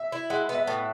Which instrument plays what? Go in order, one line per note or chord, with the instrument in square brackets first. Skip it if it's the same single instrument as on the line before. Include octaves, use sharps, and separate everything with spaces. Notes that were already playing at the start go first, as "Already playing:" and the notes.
Already playing: [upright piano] E5
[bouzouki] E4
[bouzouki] G#3 [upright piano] F#5
[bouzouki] B3
[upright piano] E5
[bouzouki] A2